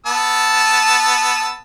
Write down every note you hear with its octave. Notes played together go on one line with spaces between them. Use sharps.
B3 A5 E6